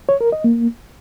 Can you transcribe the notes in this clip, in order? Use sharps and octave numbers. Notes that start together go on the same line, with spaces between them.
C#5
A#4
D#5
A#3